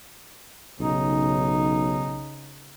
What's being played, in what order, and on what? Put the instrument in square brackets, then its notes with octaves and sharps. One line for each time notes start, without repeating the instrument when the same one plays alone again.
[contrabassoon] B1 [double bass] C#3 D#4